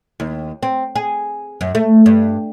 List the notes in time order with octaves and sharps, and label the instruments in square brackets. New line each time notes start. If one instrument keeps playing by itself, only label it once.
[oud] D#2
C4
G#4
F#2
A3
G2